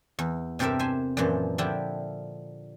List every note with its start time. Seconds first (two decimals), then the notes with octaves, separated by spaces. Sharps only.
0.19 E2
0.59 G2 C3 G4 A4 A#4 E5
0.79 C5 E5 G#5
1.17 F#2 A#2 E3 F3
1.58 D3 F3 E4 G4